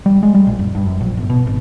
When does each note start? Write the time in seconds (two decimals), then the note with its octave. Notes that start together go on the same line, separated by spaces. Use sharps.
0.06 G3
0.23 G#3
0.35 G3
0.47 A#1
0.59 F#1
0.75 G2
0.86 F#2
1.00 A#1
1.17 G1
1.30 B2
1.47 G#1